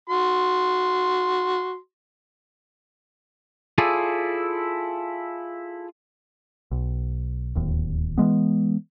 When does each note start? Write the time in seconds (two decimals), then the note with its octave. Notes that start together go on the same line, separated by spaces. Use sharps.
0.10 F#4 C6
3.78 E4 F4 G#4 A4 D5
6.71 B1
7.55 D1 D#2
8.18 E3 G#3 B3